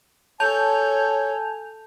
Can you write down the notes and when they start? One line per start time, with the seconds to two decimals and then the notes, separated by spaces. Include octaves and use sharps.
0.40 A4 C#5 G#5 A5 G6 F7